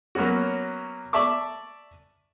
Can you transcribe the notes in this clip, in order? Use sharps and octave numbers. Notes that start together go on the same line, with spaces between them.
F#3 A#3 B3 C#4 F#4
D5 E5 A5 C#6 D6